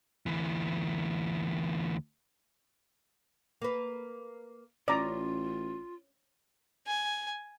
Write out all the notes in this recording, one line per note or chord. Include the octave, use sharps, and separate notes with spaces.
D2 E3
A#3 B4
A1 C#4 F4 D5 A#5
G#5